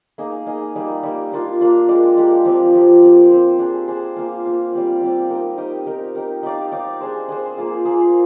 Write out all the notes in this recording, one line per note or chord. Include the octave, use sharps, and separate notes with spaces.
A#3 D#4 G#4 D#5
A#3 D#4 G#4 D#5
G3 A#3 D#4
G3 A#3 D#4
A#3 D4 F4
A#3 D4 F4
G#3 D4 G4 A#4
G#3 D4 G4 A#4
F3 C4 G4
F3 C4 G4
C4 G4 C5
C4 G4 C5
D4 G#4 C5
D4 G#4 C5
A#3 F4 C5 F5
A#3 F4 C5 F5
G3 C4 G4 D5
G3 C4 G4 D5
D#4 G4 A#4 D#5
D#4 G4 A#4 D#5
D#4 G4 A#4
D#4 G4 A#4
D#4 G4 D5 F5
D#4 G4 D5 F5
D4 G#4 C5
D4 G#4 C5
A#3 F4 G#4
A#3 F4 G#4